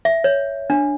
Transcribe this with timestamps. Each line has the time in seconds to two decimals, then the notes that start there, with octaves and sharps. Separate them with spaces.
0.05 E5
0.24 C#5
0.70 D4